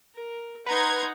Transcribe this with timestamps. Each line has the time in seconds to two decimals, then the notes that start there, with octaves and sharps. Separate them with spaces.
0.15 A#4
0.66 D#4 B4 F#5 A#5 C6 G#6